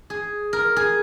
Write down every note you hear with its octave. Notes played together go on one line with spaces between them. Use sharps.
G#4
A#4
G#4